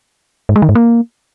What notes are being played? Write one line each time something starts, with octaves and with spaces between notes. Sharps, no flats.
G#2
G#3
D#3
G#2
A#3